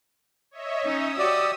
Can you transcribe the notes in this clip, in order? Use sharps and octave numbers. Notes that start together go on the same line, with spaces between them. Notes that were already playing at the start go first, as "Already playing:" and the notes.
C#5 D#5 E5
C#4 D#4 D#6 E6
F#4 G4 D5